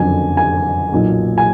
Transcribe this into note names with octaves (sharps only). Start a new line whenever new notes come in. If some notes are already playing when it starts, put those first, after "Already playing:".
Already playing: F#1 F2 D3 F#3 G#5
G#5
B1 A#2 F#3
G#5